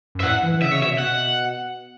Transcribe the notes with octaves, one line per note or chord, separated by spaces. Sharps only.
F#2
E5
A2 F#5
E3
E3
C#3 E5
C#3 C#5
B2 E5
B2 F#5